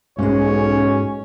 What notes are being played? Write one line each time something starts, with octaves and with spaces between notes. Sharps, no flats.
B1 G#2 G#3 C#4 C#5